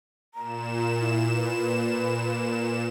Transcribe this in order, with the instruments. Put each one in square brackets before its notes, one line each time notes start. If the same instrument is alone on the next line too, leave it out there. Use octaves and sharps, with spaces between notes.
[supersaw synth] A#2 E7 [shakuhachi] A#5
[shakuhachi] E4
B4